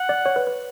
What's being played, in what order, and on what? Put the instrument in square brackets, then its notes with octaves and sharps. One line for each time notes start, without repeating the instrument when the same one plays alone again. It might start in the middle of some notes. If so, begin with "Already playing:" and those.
Already playing: [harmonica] F#5
[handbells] D5
C#5
B4
B4